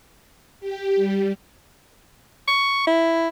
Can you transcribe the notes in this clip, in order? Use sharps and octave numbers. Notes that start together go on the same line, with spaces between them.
G4
G3
C#6
E4